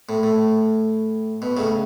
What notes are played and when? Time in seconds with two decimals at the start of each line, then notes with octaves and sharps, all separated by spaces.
0.09 A2
0.23 A2
1.42 B2
1.57 A2 C#3